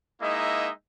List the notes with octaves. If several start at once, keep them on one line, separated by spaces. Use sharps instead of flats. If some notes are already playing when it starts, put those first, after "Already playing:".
G#3 A#3 D#4 E4 D#5 E5